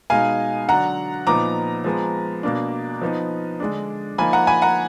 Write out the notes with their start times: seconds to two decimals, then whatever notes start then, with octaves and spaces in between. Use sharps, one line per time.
0.10 B2 G#3 D#4 F5 G#5
0.68 D3 F#3 D4 F#5 A#5
1.27 A#2 F3 B3 D#4 A#5 D6
1.84 F3 G#3 B3
2.43 B2 A#3 D4
3.02 F3 B3 D#4
3.60 D3 G#3 D4
4.18 F3 A#3 D#4 G#5 B5
4.33 F#5 A#5
4.47 G#5 B5
4.62 F#5 A#5